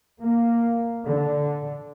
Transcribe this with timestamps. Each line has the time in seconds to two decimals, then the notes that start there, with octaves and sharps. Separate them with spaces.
0.20 A#3
1.04 D3